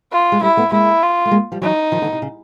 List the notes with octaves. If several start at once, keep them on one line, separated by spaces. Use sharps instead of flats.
F4
G#3
G3 A3 E4
A3 B3
G#3 A#3 E4
F4
A3
G#3 A#3
F3 G3
E3 F#3 D#4
D#3 F3
D3 E3
C3
C#3